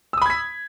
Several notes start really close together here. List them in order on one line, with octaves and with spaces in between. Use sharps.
E6 D#6 B5 G#6 B6